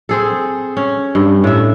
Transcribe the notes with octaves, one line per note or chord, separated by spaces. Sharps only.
C4 G#4 A4
C#4
G2
A2 E5